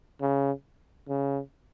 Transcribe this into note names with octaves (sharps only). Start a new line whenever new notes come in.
C#3
C#3